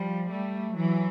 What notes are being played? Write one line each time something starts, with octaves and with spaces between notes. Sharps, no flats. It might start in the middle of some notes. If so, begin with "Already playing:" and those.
Already playing: F3 G3
G3 A3
E3 F#3